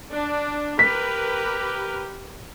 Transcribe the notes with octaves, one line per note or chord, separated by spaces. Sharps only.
D4
G4 A#4 B4 B6